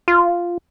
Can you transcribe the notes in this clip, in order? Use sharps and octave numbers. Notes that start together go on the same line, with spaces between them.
F4